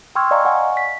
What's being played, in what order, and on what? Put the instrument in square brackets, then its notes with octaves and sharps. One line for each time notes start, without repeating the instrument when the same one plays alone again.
[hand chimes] G5 C6 C#6 E6 F6 G#6
D5 D#5 F5 G#5 A#5 C#6
F#5 G#5 C#6
B6